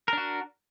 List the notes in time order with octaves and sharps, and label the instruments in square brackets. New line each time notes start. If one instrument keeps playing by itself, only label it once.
[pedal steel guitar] A#4
D4
F#4